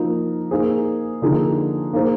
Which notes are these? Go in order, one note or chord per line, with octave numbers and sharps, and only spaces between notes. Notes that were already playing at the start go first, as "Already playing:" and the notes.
Already playing: F3 A#3 D#4 A#4
A#3 D#4 G#4 C5
D3 F3 A#3 D#4 G#4
A#3 D#4 G#4 C5